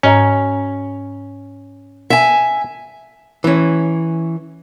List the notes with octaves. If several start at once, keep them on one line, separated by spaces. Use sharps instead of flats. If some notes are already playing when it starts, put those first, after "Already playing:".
G#2 C#4 D#5 A#5
E5 G#5
E3 C#4